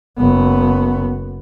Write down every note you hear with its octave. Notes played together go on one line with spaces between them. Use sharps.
F#1 B3